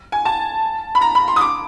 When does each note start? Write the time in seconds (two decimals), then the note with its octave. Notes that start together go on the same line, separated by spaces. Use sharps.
0.12 G#5
0.25 A5
0.95 B5
1.01 A#5
1.15 B5
1.28 C6
1.36 D#6
1.41 D6